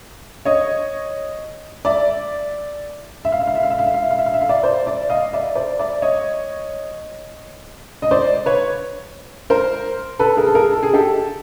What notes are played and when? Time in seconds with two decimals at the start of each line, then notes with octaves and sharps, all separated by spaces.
0.45 C#5 D#5
1.85 D5 E5
3.25 E5
3.32 F5
3.40 E5
3.47 F5
3.55 E5
3.63 F5
3.70 E5
3.79 F5
3.87 E5
3.94 F5
4.02 E5
4.11 F5
4.18 E5
4.26 F5
4.34 E5
4.42 F5
4.49 D5 E5
4.63 C5 D5
4.86 D5 E5
5.10 D#5 F5
5.33 D5 E5
5.55 C5 D5
5.79 D5 E5
6.02 C#5 D#5
8.02 D#5
8.11 C5 D5
8.46 B4 C#5
9.50 A#4 C5
10.19 A4 B4
10.37 G#4 A#4
10.47 A4
10.55 G#4 A#4
10.71 A4
10.83 G#4
10.94 G4 A4